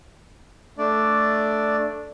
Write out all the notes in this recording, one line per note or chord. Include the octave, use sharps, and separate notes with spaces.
A3 D4 D5